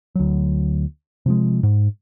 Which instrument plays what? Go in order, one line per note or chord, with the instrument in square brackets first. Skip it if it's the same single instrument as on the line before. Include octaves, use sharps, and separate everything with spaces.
[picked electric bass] D2 F#3
C3 F3 G#3
G#2